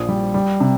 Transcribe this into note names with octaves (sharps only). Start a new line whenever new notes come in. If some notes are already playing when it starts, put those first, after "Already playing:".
Already playing: A#1 F3 D#6
G3
G3
C3